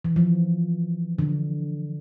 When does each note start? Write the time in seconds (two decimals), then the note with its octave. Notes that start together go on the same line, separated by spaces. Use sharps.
0.05 E3
0.16 F3
1.19 D3